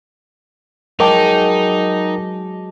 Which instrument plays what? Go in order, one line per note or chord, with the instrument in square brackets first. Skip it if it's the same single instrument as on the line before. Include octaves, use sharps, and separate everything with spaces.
[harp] F#3 G#3 [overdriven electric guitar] D#4 [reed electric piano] A#4 G5 [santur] A5 D6